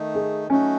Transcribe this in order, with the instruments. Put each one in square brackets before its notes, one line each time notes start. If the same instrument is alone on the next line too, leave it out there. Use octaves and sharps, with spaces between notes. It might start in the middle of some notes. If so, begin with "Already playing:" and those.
Already playing: [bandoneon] D#3 A3 D#4
[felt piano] G#4
[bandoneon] F#3 A3 D#4 F#4 [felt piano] C#4